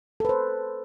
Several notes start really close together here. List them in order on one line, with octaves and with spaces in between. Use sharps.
A4 B4 C5